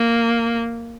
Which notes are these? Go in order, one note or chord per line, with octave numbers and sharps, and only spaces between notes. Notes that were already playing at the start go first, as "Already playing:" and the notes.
Already playing: A#3